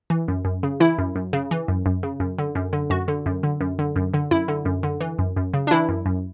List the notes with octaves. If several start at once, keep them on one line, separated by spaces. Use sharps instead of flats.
E3
F#2
F#2
C#3
E3 E4
F#2
F#2
C#3
E3
F#2
F#2
C#3
F#2
D3
F#2
D3
F#2 F#4
D3
F#2
D3
F#2
D3
F#2
D3
F#2 E4
D3
F#2
D3
E3
F#2
F#2
C#3
D4
E3 E4
F#2
F#2